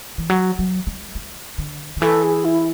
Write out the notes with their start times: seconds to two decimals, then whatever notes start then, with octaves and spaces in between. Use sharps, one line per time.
0.18 E3
0.30 F#3
0.59 F#3
0.87 G#3
1.15 G#3
1.58 D3
1.97 D3
2.02 E3 A4
2.23 G#4
2.44 E4